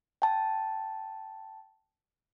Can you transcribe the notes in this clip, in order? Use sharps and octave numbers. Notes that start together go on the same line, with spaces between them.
G5 A5